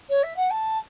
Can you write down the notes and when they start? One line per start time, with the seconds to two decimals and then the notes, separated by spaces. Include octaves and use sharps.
0.09 C#5
0.23 E5
0.36 F#5
0.50 A5